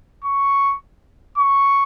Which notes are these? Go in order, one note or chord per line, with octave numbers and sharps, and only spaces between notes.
C#6
C#6